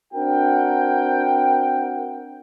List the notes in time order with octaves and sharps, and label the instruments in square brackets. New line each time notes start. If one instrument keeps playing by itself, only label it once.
[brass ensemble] C4 D4 F#4 A#4 F#5 G5